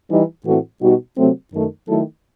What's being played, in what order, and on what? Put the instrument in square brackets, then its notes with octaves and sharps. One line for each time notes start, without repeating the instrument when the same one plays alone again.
[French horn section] E3 G3 D#4
A2 E3 A3 C4 F#4
B2 G3 D#4 F#4
C3 F#3 A3 C4
F#2 D#3 A3
D#3 F#3 A3 E4 A4